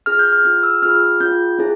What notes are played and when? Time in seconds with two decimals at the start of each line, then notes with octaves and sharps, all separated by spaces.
0.06 C#4 F4 G#4 F6
0.19 G6
0.33 F6
0.45 C#4 F4 G#4 F6
0.63 E6
0.82 C#4 F4 G#4 F6
1.20 C#4 F4 G#4 G6
1.59 C#4 E4 G#4